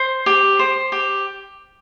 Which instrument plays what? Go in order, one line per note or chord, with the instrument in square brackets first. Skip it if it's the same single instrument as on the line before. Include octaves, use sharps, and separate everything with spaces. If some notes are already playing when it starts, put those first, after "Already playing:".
Already playing: [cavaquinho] C5
G4
C5
G4